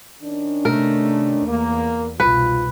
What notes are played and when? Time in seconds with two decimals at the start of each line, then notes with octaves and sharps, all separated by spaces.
0.22 D#3 C#4 D4
0.65 C3 A3 A#4
1.46 E2 A#3
2.20 C2 G#2 B2 F4 B4